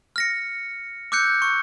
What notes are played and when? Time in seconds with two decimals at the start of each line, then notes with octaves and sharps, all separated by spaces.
0.16 F6 A#6 C#7
1.12 D6 E6 F#6 G6 C#7
1.42 C#6